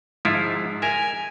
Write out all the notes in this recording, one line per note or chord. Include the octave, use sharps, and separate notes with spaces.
G#2 F3 E4 F4
A#4 E5 G#5 G#6 F7